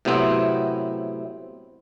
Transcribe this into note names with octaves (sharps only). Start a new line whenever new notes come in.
A2 C3 F#3 B3 C4 E4